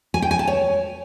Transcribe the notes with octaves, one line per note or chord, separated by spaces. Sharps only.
G#5
G5
G#5
A5
C#5